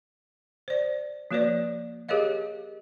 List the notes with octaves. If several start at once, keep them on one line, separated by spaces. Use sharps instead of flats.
C5 D5
F3 A#3 F#4 B4 C#5 D5
G4 G#4 A#4 C#5 D#5 F5